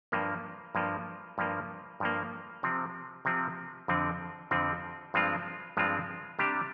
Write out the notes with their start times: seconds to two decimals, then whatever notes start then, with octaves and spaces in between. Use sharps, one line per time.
0.12 G2 F3 A#3
0.75 G2 F3 A#3
1.38 G2 F3 A#3
2.00 G2 F3 A#3
2.63 C3 F3 C4
3.25 C3 F3 C4
3.88 F2 D3 F3 C4
4.51 F2 D3 F3 C4
5.14 G2 F3 G#3 C4 F4
5.77 G2 F3 G#3 C4 F4
6.39 C3 G3 D4 G4